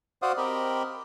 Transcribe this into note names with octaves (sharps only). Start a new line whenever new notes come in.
F#4 C5 D5 F5 F#5 D#6
C4 G4 A#4 D#5 B5